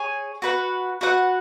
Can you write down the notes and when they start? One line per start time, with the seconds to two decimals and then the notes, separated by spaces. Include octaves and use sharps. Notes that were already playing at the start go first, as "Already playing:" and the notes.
Already playing: G#4 C#5 G#5
0.42 F#4 B4 F#5
1.01 F#4 B4 F#5